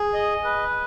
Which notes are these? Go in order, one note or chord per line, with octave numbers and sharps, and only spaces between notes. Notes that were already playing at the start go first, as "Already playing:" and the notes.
Already playing: G#4
D#5
B4